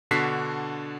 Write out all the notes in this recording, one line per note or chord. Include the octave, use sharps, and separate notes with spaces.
B2 D3 D4 F#4 B6 C7